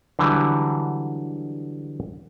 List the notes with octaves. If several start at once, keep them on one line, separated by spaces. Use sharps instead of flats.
D3 E3 F#3 G3